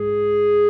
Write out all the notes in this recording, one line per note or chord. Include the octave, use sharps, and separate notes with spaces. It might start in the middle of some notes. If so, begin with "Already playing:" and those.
Already playing: G#2 G#3 G#4